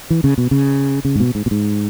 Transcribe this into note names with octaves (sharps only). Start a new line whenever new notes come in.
E3
C#3
B2
C#3
C#3
G#2
B2
G#2
B2
G#2